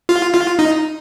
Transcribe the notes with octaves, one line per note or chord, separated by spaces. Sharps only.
F4
F4
D#4